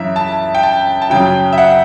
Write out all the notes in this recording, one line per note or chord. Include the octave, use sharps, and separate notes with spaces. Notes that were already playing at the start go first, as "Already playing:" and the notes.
Already playing: F#2 C#3 E3 E5
A5
G5
A5
A5
F#2 C#3 F#3 G5
E5
F#5